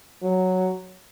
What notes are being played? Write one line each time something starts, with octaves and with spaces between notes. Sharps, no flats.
F#3